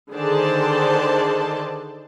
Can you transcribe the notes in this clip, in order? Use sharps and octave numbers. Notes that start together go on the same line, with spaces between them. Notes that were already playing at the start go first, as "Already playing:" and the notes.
D3 D#3 G#4 C5 D5 A5